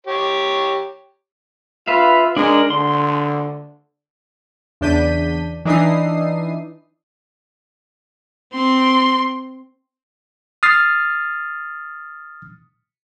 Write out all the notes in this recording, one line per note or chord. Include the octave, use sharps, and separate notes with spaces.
G4 C#5
F4 B4 E5 F5
G#3 D4 A#4
D3 C6
E2 C#3 D4 G6 B6 D#7
E3 D4 D#4 E5 D#6 C7
C4 C6
D#6 F6 A6 C7